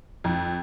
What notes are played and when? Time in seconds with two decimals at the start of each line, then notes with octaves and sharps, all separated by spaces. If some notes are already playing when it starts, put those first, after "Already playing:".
0.24 F2